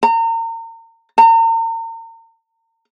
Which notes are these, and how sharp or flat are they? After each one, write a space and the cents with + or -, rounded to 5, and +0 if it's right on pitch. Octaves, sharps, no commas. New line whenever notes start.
A#5 -35
A#5 -40